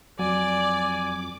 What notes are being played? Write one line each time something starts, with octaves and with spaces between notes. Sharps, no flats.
F2 F#3 D5 G#5 D6